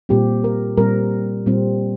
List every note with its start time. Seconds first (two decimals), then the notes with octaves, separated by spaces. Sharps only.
0.09 A#2 G3 C4 G4
0.44 A#4
0.77 A#2 G3 C4 A#4
1.46 A#2 G3 C4